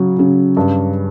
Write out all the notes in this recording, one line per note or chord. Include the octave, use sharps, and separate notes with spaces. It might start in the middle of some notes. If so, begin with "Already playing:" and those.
Already playing: C#3 F#3
C#3
G2